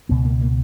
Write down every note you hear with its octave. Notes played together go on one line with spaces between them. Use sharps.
C#2 B2 B3
A#3
A#3